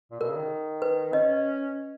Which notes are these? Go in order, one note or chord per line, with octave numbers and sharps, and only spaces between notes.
A#2
B2 A#4
C#3
D#3
B4
C#4 D#5